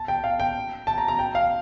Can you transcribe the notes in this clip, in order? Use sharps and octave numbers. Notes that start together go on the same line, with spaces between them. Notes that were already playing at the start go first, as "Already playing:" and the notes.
Already playing: A5
G5
F5
G5
A5
A#5
A#5
G5
F5